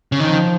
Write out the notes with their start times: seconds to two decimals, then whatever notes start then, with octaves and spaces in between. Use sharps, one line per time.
0.12 C#3
0.20 D#3 F3